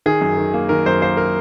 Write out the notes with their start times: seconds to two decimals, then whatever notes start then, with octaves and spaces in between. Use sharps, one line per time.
0.06 D#3 G#4
0.21 F#2
0.38 D#3
0.54 A#3
0.69 D#3 A#4
0.86 F#2 C5
1.02 A#3 C5
1.17 A#4